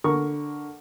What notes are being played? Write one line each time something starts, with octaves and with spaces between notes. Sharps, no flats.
D3 A#4 C#6